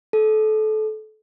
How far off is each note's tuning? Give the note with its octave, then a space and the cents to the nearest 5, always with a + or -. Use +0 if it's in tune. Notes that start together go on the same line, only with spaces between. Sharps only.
A4 -25